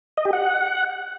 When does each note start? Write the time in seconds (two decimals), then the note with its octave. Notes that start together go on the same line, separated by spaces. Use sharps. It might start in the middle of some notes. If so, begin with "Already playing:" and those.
0.17 D#5
0.25 G4
0.33 F#5